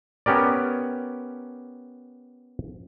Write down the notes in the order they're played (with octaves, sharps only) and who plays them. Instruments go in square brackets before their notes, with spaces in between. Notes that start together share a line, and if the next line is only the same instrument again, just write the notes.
[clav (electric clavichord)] B3 C#4 G4 A#4 D5